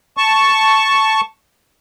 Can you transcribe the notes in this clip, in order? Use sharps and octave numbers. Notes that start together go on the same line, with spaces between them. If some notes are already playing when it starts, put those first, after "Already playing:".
A5 C#6